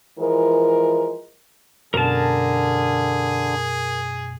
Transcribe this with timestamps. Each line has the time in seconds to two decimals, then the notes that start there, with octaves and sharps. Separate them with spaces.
0.19 E3 F3 G#3 A#4
1.94 F#2 B2 D3 G#4 A#4 A5